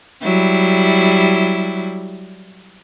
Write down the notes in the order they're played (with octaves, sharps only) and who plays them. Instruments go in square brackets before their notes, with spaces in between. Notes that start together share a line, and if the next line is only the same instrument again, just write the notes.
[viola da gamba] F#3 G3 E4